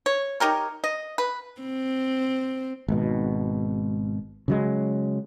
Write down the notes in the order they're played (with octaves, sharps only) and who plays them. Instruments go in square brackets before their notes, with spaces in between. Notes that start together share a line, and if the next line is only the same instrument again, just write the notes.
[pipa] C#5
D#4 G4 A#4 C#5
D#5
B4
[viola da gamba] C4
[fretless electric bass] G#1 B2
C#3 F#3 G#3